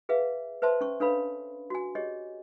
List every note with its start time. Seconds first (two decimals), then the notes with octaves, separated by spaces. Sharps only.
0.09 G#4 B4 E5 F5
0.62 B4 C5 E5 A5 C6
0.81 C#4 C#6
1.00 D4 A4 B4 C#5 F5 B5
1.70 F#4 G#5
1.95 G4 G#4 C#5 D#5